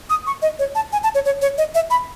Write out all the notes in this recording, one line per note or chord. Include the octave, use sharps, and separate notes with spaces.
D#6
C#6
D#5
C#5
A5
G#5
A5
C#5
C#5
C#5
D#5
E5
B5